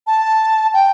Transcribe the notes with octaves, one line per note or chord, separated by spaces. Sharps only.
A5
G5